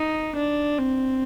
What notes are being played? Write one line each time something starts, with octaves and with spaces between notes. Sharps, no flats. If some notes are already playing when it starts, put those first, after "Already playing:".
Already playing: D#4
D4
C4